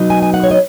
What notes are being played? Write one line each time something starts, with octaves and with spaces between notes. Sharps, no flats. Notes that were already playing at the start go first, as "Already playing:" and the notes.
Already playing: B2 F#3 B3 D#4
G#5
G#5
F#5
C#5
D#5